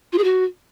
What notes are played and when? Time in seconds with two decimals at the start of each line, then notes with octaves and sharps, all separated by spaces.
0.12 F4
0.18 G#4
0.24 F#4